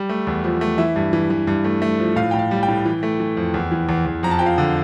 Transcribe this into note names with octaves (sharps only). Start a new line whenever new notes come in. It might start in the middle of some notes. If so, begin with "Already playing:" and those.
Already playing: G3
A3
E2
F3
A3
E3 E5
G2
E3
E3
G2
A3
A3
F3
A2 F5
A2 G5
F5
G3
G5
A2
E3
A3
E3
F2
E2
E3
E2
E2
F2 A#5
A5
F3 G5
F5
D3